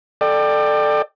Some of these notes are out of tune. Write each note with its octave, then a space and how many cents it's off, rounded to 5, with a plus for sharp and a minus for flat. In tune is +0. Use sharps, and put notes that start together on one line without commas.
A4 +0 D5 +25 G5 +5